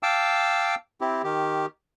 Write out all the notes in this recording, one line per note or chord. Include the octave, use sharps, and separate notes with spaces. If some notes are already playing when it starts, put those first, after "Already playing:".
F5 G5 A5 D6 E6
C4 E4 G4
D#3 G4